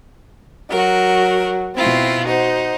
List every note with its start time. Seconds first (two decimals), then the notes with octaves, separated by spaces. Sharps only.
0.71 F#3 F#4 A#4
1.76 B2 C4 E4 F4
2.25 D#4 F#4 C5